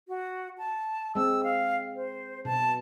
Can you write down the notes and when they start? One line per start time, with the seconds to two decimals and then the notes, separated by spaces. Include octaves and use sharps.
0.08 F#4
0.58 A5
1.15 G#3 C4 E6
1.44 F5
1.96 C5
2.45 B2 A5